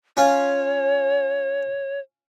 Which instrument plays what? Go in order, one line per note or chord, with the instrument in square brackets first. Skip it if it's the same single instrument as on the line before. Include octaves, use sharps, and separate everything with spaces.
[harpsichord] C#4 F4 [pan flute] C#5